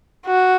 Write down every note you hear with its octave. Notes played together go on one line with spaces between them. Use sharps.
F#4